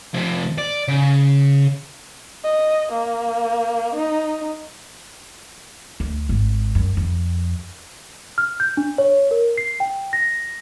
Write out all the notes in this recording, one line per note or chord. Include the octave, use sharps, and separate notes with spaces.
F2 C3
D5
C#3
D#5
A#3
D#4
D2
G#1
F#2
F2
F6
G6
D4
C#5
A#4
C7
G5
A#6